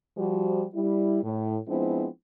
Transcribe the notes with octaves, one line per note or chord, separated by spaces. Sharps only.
F3 G3 F#4
G3 E4
A2
F3 G#3 B3 C4 D4 E4